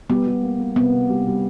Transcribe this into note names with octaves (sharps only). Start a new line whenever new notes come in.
G3 B3
G3
A#3
A#3
C3 B3
C3
G3
G3